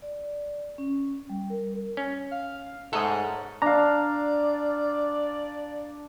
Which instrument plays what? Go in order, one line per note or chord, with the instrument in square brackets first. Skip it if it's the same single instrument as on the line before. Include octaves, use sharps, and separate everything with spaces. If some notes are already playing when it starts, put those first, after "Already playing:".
[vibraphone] D5
C#4
G3
A#4
[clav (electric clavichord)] C#4
[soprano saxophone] F5
[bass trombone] G#2 [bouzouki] A3 C#4 A#4 [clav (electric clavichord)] A4 D#5 [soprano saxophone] F#5
[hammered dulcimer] D4 F5 [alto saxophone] D5 [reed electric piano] A#5